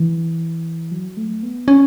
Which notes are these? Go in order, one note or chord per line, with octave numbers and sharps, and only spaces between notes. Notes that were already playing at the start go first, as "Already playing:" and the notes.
Already playing: E3
F#3
A3
B3
C#4